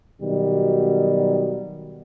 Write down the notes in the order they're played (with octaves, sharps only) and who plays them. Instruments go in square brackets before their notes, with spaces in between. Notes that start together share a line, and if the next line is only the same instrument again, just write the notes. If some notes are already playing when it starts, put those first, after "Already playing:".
[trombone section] B2 D#3 F#3 G3